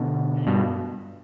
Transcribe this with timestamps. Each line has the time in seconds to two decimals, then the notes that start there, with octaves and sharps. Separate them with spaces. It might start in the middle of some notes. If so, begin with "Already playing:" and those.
Already playing: B2 D3
0.47 G2 B2